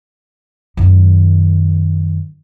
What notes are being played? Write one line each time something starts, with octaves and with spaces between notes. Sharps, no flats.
F#2 D#3